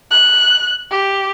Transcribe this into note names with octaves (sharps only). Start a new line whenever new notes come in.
F#6
G4